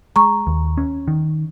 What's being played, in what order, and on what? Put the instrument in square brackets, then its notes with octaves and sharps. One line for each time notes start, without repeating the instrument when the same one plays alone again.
[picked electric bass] G#3 [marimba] A#5 C#6
[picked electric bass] D#2
C#4
D#3